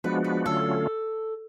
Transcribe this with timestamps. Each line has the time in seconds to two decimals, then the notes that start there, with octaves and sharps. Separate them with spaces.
0.04 F3 G#3 B3 D4 F#4 B4
0.24 B4
0.46 D3 F#3 A3 C#4 F4 A4